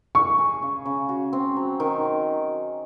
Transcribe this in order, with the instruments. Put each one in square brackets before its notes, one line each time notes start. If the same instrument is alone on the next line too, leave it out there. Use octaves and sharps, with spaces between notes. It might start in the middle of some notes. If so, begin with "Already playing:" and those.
[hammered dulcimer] G#4 [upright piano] C#6
[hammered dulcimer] G#4
C#3
C#3
F#4
C4
F#3
D#3